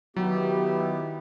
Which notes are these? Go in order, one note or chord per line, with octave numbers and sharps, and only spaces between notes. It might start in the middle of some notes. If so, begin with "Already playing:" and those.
D#3 F#3 B3 E4 G4